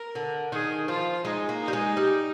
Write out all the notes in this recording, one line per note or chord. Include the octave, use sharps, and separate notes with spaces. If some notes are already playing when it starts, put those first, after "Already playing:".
Already playing: A#4
D3
D#3 G#4
F3 F4
G#3 D#4
A#3
D#4
G3
G#3
G3